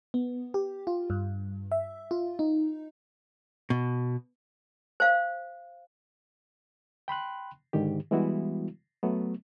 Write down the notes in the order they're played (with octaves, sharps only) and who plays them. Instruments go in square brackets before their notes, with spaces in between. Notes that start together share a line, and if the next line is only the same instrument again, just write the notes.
[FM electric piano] B3
G4
F4
G2
E5
F4
D#4
[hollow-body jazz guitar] B2
[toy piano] C5 F5
[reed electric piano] G5 B5 C6 F#6
G#2 D3 D#3 G4
E3 G3 G#3 B3 E4 F#4
F#3 A3 B3